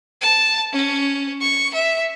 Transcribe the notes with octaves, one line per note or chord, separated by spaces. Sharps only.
A5
C#4
C#6
E5